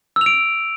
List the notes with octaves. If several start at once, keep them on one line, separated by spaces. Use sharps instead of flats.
E6
F7
D7